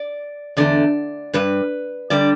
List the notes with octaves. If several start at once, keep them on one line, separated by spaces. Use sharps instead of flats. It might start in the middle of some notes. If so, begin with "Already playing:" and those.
Already playing: D5
E2 D3 A3 D5
G2 G3 B4
D3 G3 D5